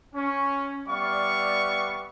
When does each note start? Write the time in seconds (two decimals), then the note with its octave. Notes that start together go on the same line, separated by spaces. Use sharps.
0.15 C#4
0.88 G3 B3 D5 E5 F5 C#6